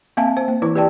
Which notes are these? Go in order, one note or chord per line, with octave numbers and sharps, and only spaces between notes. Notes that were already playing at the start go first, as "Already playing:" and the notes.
A#3 C4 E5 F5 G#5 A5
C5
A#3
E3 E4 B4
G4 B4 D5 G5 A5